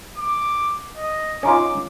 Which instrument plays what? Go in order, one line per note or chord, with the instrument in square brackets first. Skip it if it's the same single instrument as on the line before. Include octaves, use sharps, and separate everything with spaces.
[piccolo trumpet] D6
D#5
[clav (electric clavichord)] C#4 D#4 F4 [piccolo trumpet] D6